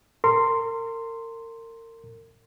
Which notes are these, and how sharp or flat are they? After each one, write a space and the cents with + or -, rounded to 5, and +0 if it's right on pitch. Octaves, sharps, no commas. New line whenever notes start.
A#4 -35 C6 +0